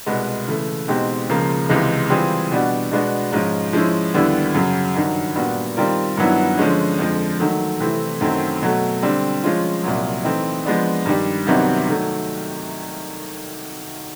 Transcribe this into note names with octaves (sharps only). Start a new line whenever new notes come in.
C2 B2 G#3 B3
C#3 E3 A3
B2 G#3 C4 D#4 G4
C#2 C#3 F3 A#3
C#2 C3 E3 G#3
E3 G3 C4 F4 G#4
B2 G3 B3 D4 F#4
B2 G#3 B3 D4 F#4
G#2 F3 G#3 C#4 F4
F3 G#3 C#4 E4
D#2 D3 G3 B3 E4
F#2 C#3 F#3
G2 D#3 F#3
A#2 G3 B3 D4 F#4
D#3 G3 C4 F4 A#4
G2 D#3 F#3 B3 E4
D3 F3 G#3 C#4
F2 D3 F3 G#3
D#3 F#3 A3
C3 E3 A3 C4 E4
F#2 D#3 F#3 A3 C4
B2 F#3 A3
D3 G3 C4
F3 G#3 C#4 F4
C2 A#2 F#3
E3 A3 C4 D#4
F3 G#3 B3 D4
G2 D#3 G3
C2 C3 D#3 F#3 B3
D#3 F#3 A3